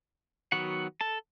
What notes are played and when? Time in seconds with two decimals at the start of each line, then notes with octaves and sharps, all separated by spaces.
0.52 D#3 F#3 B3 F#4 F#5
1.01 A4 A5